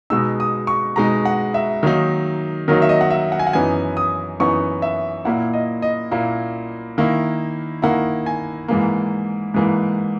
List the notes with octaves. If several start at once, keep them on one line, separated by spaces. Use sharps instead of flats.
B2 G#3 D#4 E6
D#6
C#6
B2 G#3 D#4 A#5
F#5
E5
D#3 F#3 A#3 D#4
D#3 F#3 A#3 D#4 A#4
E5
D#5
F#5
E5
F#5
G#5
F#5
F#2 E3 B3 D#4 G#5
D#6
F#2 E3 B3 D#4 C#6
E5
A#2 A#3 E4 F#5
D#5
D#5
A#2 A#3 E4
D#3 A#3 E4
D#3 A#3 E4 F#5
G#5
G#2 E3 A#3
G#2 E3 A#3